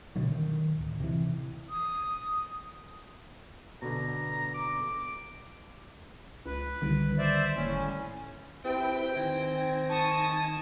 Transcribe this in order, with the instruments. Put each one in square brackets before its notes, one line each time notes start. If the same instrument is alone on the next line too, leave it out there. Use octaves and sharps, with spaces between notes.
[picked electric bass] B2 D3 D#3 F#3
D#3
D1
C3 E3
[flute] D#6
[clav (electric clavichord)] B2 D3 [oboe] A#5
[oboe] D6
[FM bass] C#2 [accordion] B4
[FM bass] C2 [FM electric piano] D3 D#3 G3
[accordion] C5 D5 E5
[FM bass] F#1 [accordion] A2 C#4
[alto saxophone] C4 [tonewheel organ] E4 G4 B4 [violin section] G5
[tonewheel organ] D#3 G#5 A#6
[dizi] A5 [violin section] C#6 D#6